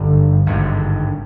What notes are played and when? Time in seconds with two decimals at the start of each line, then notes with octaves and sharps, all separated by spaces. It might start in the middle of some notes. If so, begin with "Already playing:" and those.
Already playing: G#1 G2 D3
0.46 G#1 G2 D3